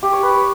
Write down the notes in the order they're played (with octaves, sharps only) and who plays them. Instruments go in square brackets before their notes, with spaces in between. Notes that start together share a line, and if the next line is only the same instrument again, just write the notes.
[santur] G4
C#5
B4